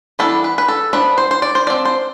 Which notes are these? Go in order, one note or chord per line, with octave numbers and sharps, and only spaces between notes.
E3 G3 B3 D4 A4
B4
B4
A4
F3 B3 D4 B4
C5
C5
D5
C5
F3 C4 D5
C5